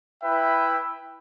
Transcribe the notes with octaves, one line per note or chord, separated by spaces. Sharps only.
E4 B4 E5 G5